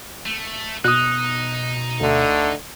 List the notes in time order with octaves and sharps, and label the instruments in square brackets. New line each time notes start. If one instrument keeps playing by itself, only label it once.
[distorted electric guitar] A3
[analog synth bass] B2 [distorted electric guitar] D#4 [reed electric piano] D#6 F#6
[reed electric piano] D2 [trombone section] D3 A3